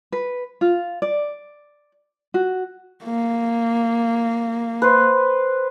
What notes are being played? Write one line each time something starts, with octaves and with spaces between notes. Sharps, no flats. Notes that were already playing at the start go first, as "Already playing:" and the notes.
B4
F4
D5
F#4
A#3
B4 C5